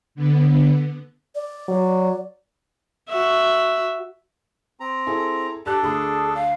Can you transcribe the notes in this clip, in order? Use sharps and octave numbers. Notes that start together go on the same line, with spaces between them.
D3 B3
D5
F#3
F#4 E5
C4 A#5
E4 G#4 A4
D4 G4 A4 A5 F#6
D2 G#4 B5
F5